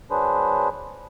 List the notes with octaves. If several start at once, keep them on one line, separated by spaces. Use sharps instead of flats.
F#3 D4 G#4 B4 C5